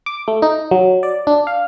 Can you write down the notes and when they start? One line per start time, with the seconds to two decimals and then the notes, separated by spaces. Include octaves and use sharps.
0.06 D6
0.28 A3
0.42 D#4
0.71 F#3
1.03 D5
1.27 D4
1.47 F5